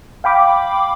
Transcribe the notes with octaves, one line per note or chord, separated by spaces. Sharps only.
F5 G5 B5 D6